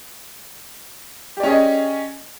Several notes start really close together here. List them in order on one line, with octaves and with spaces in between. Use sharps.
G4 D5 C#4 G#4 D#5